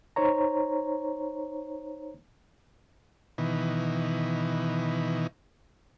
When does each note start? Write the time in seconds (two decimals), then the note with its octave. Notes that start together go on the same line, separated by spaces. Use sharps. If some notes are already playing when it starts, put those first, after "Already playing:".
0.16 D#4 C5 C#5 A#5
3.38 B2 D#3 E3